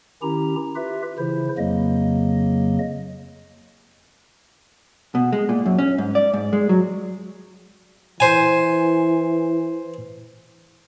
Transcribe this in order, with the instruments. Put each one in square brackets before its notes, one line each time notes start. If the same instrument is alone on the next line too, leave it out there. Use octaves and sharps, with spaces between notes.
[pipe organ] D#3 C#4 E4 G4 A#5
F4 G4 B4 E5
C#3 E3 E4 C5
F2 C#3 F#3 A#3 D#5
[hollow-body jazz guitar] B2
G#3
A#2
F#2
C#4
G#2
D5
G#2
G#3
F#3
[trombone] E3 [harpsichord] C5 G#5